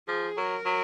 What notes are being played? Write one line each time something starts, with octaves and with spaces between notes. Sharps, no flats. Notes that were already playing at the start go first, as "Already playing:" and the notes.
F3 G#4
F#3 A#4
F#3